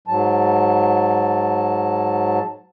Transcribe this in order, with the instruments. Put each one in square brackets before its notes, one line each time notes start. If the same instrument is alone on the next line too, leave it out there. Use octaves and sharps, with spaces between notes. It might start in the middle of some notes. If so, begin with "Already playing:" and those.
[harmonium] G#2 F#3 A5